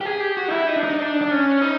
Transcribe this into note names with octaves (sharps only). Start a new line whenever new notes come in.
G4
G#4
G4
F#4
D#4
E4
D#4
D4
D#4
D4
D4
C#4
D#4